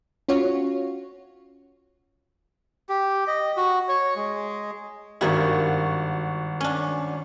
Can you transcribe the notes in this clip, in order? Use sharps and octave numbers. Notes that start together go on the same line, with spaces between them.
C#4 F4 F#4 C#5
G4
D#5
F#4
C#5
G#3
G#1 G2 A#3 E4 F#4 C#6
C#4 D4